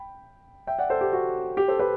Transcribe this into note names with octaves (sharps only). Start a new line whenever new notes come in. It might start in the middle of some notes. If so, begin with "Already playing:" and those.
Already playing: G5 B5
E5 G5
D5 F#5
A4 C5
G4
F#4
G4
A4 C5
G4 B4